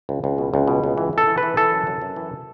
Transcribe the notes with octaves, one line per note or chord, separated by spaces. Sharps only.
C#2
C#2
B2
C#2
B2
C#2
E3
E3 A4
E3
B4
E3
E3 A4
F#2
F#2
F#2
E3